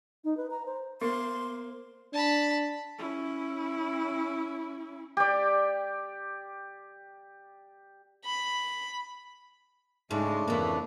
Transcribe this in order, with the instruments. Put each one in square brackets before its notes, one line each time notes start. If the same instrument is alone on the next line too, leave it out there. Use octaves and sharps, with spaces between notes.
[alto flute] D#4
B4
A#5
C5
[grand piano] A#3 [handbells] B3 [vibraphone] C5 [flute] C6
[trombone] D4 [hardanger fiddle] A5 B5
[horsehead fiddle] C#4 E4
[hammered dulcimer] G4 D5
[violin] B5
[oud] G#2 [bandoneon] C#3 A3 D4 [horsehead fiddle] G#3
[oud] F2 E3 [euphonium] A#3